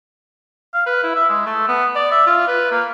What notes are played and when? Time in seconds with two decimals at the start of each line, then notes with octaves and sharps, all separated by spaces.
0.74 F5
0.86 B4
1.04 E4
1.16 E5
1.29 G#3
1.46 A3
1.68 B3
1.96 D5
2.12 E5
2.27 F4
2.48 B4
2.71 A#3